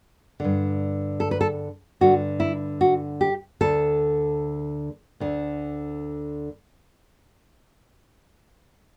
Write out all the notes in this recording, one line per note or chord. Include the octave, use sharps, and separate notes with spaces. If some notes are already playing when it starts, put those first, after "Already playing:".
G2 D3
A4
B4
A4
G2 D3 F#4
E4
F#4
G4
D2 D3 A4
D2 D3